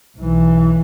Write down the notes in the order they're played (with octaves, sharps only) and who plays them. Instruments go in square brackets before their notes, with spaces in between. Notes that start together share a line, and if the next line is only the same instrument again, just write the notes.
[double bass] B1 E3